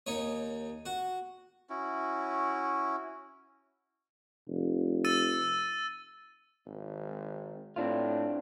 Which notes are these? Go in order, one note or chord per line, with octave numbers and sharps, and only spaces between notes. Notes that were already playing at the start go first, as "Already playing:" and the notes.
D#2 D#4 C#5
F#4
C#4 E4 F#4
F1
E6 A6 D#7
G#1
A2 C4 D4 F4